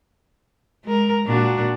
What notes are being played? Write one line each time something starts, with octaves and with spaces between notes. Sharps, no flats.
G#3 A#4
A#2 D4 F#4